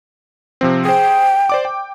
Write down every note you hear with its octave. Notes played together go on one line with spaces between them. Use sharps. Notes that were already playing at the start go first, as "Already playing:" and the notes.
C3 F3 C4
G#4 C5 G5
C5 D5 D6
G5